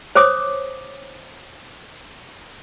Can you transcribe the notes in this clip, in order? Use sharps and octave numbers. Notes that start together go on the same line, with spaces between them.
C5 C#5 D6 D#6